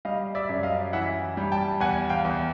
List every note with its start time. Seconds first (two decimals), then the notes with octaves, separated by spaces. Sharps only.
0.05 G3 D#5 F5
0.35 D5 E5
0.49 F#2
0.63 D#5 F5
0.93 E3 E5 F#5
1.37 G3
1.52 G5 A5
1.80 E2 F#5 G#5
2.09 F5 G5
2.25 E2